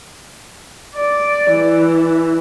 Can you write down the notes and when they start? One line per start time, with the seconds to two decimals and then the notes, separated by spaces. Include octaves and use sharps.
0.95 D5
1.52 E3